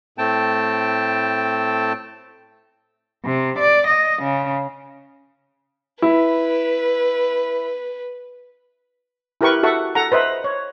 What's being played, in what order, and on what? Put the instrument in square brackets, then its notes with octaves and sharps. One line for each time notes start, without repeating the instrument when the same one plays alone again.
[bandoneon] A2 A3 C4 G5 A5
[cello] C3
D5
D#5
C#3
[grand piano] E4 [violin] B4
[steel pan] E4 G4 A#4 B4 G5 C#6
F#4 A4 E5 F#5 C#6
A4 F#5 A#5
B4 C5 D#5 E5
C#5